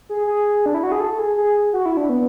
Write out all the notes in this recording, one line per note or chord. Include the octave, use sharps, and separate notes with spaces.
G#4
G#4
D4
E4
F#4
G#4
A4
G#4
G#4
F#4
E4
D4
B3